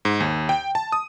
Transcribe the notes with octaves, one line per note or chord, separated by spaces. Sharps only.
G#2
D#2
G5
A5
D#6